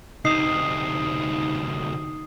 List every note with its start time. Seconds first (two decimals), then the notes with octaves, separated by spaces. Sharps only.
0.25 D2 C3 D#4 D#6 C7